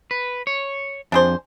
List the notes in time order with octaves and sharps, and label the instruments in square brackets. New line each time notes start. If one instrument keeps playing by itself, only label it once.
[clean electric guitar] B4
C#5
[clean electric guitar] F2 [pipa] D4 G#4 C5